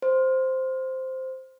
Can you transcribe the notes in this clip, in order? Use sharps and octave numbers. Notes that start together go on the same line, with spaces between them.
C5